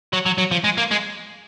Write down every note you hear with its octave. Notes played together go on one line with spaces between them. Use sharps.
F#3
F#3
F#3
F3
G#3
A#3
G#3